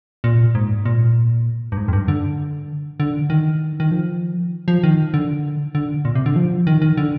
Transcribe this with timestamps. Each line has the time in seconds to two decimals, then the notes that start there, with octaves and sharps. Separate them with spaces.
0.24 A#2
0.55 G#2
0.86 A#2
1.72 G2
1.77 G#2
1.88 F2
1.93 G2
2.08 D3
3.00 D3
3.30 D#3
3.80 D#3
3.91 F3
4.68 F3
4.83 D#3
5.14 D3
5.75 D3
6.05 A#2
6.15 C3
6.26 D3
6.36 F3
6.67 D#3
6.82 D#3
6.97 D3